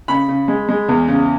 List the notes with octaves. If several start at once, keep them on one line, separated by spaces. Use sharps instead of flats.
C#3 B5
C#3
G#3
G#3
E2
C#3